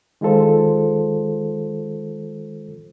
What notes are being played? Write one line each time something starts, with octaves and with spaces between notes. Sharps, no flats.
D#3 G#3 F4 A4 C5